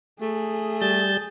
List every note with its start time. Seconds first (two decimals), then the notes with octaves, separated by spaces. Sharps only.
0.21 A3 G#4
0.82 G3 A5 G6